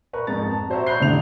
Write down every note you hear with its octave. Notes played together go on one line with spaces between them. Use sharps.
A#4 B4 A#5 C#6
F2 G#2 A#5 A6
A5
F#4 C5 C#5 E5 A#5 C#6
A#5 B5 C#6 F#6 G6 C7
A1 A2 D3 F7